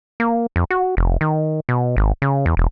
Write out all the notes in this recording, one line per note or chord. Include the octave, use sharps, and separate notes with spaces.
A#3
F2
F#4
F1
D#3
B2
G#1
C#3
E2
E1